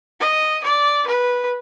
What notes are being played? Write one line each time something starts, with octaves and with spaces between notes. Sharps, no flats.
D#5
D5
B4